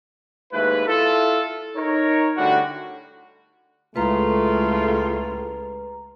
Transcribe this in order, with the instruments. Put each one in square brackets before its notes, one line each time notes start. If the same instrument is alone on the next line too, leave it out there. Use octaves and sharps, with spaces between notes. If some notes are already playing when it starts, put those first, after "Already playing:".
[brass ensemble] D#2 G#2 A3 E4 B4
E4 F4 A4
D#4 A#4 C#5
A2 D3 G3 D4 F#4
[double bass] C#2 G#3 [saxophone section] A2 F4 [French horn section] A3 [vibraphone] B4 A#5